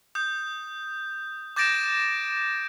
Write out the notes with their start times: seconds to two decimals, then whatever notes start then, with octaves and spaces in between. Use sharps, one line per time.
0.15 D#6 G6
1.56 D6 G6 A6 A#6 D7 E7